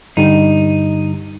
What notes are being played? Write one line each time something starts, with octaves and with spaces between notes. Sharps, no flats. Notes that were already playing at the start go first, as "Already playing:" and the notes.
G2 D3 G3 D#4